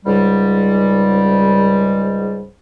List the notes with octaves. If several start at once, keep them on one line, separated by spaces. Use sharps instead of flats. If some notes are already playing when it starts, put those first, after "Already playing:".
C#2 G#2 G3